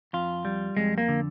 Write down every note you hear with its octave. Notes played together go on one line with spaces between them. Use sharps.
F2 F4
G3
F2 G#3
A#3
D3